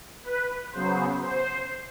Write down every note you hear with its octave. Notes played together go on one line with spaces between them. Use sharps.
B4
C#3 F#3 B3 C5
C5